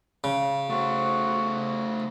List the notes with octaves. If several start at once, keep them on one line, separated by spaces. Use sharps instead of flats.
C#3
A3 F#4 C5